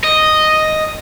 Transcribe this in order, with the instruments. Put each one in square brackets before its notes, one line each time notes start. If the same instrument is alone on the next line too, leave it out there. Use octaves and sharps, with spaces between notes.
[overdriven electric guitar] D#5